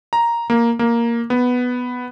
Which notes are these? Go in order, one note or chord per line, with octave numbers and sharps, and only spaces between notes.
A#5
A#3
A#3
B3